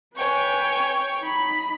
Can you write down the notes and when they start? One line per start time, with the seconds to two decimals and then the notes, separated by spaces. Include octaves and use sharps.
0.16 B4 C#5 G5 G#5
1.20 D#4 B5